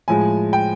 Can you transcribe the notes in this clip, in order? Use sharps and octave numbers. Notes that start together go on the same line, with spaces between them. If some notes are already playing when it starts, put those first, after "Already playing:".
A2 F3 G#3 G#5
G5